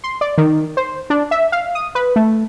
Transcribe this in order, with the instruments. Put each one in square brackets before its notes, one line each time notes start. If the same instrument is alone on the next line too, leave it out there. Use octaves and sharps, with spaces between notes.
[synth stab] C6
D5
D#3
C5
D4
E5
F5
D#6
B4
A3